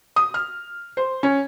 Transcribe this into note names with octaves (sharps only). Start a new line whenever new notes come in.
D#6
F6
C5
C#4